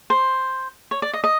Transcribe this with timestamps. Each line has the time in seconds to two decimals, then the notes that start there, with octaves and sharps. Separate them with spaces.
0.10 C5
0.91 C#5
1.02 D5
1.14 D#5
1.24 D#5